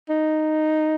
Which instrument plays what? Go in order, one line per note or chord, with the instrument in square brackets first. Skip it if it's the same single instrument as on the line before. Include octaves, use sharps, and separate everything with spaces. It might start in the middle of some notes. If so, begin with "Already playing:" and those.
[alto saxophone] D#4